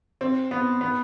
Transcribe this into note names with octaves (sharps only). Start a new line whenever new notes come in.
C4
B3
B3